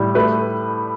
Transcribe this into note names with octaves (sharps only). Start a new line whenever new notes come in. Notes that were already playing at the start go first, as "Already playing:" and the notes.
Already playing: A2 G3
A3 B4